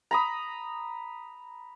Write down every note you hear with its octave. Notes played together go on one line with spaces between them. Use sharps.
A#5 B5 D#6